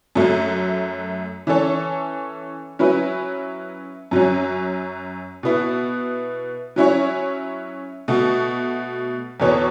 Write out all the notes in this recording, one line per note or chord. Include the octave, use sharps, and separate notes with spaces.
F#2 F#3 A3
E3 C#4 A4 C#5
F#3 C#4 E4 B4
F#2 F#3 C#4
B2 B3 E4
F#3 C#4 E4 C#5
B2 A3 F#4
E2 B2 B3 A4 C#5